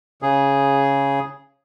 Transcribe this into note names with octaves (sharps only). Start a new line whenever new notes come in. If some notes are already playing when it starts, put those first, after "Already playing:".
C#3 G#4